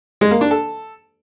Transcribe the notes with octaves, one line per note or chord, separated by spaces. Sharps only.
G#3
A#3
D4
A4